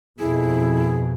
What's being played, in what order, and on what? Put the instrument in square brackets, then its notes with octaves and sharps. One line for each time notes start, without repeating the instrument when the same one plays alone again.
[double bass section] F2 B2 [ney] E4 [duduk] G#4